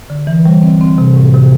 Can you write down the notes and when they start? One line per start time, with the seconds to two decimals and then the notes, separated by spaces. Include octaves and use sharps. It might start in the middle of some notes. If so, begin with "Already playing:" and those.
0.10 D3
0.27 E3
0.45 G3
0.63 C4
0.81 C4
0.98 C3
1.16 A2
1.34 C3